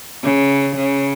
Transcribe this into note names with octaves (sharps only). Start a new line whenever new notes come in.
C#3
C#3